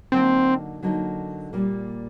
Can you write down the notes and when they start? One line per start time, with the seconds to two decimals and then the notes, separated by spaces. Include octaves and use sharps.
0.12 D3 F#3 A#3 C4 D#4
0.83 D3 F#3 A#3 D#4
1.53 A#2 G3 A#3